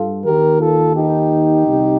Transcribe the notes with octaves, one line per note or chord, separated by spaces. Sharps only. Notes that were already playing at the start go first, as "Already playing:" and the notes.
Already playing: G2 F4 A4
D#2 D#3 G4 A#4
F4 A4
D#4 G4
C2 C3 D#3